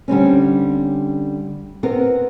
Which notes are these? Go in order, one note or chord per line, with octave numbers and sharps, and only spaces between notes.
D3 G3 C4 C#4
B3 C4 A#4